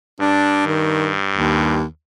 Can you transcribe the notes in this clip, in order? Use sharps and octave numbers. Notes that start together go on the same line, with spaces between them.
G2 D4
D#3
D#2